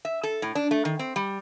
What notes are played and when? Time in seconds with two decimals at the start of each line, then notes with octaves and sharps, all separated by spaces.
0.05 E5
0.23 A4
0.42 A2
0.55 D4
0.71 A3
0.85 D#3
0.99 C4
1.16 G3